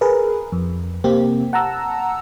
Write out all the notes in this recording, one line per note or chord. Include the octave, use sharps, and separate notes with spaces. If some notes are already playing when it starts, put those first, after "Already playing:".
G#4 A#4 B4
F2
C3 A#3 C4 G4
F#5 A5 A#5 E6